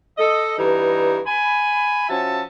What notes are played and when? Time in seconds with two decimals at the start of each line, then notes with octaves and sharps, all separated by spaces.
0.18 A4 D#5
0.58 G2 E3 G3 D#4 A#5
1.26 G#5 B5
2.09 F3 C#4 F#4 E5 A5